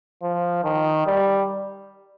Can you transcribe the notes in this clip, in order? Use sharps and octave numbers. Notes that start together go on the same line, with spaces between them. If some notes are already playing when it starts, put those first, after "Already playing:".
F3
D#3
G3